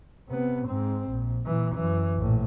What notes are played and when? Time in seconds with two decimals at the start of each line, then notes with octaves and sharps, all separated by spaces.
0.28 C3 B3
0.67 G#2 C4
1.10 A#1
1.46 A#2 E3
1.74 F#2 E3
2.16 A#1 A2